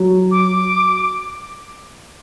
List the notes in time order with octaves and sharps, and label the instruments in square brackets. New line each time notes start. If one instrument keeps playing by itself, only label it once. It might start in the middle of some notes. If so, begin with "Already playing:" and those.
Already playing: [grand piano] F#3
[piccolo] D6